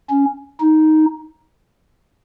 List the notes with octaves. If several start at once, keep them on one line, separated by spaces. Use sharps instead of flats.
C#4
D#4